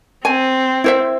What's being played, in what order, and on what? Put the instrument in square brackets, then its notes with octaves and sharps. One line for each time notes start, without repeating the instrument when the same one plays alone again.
[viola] C4 [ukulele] G#5
[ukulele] E4 C5 E5